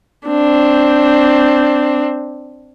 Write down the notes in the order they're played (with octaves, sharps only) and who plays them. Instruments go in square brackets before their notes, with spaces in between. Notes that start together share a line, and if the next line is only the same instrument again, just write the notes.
[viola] C4 D4